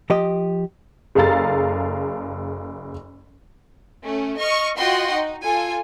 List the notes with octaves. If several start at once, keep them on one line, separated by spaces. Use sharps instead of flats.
F3 G4 D#5
F#1 G#4 A4 F5 A#5 A6
A3 C#4
D#5 C#6 F6
F4 F#4 D#5 F#5 G5 C6
D#4
F4 A4 G#5